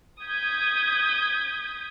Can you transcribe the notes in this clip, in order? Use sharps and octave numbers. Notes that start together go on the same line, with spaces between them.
D#6 G6 G#6 B6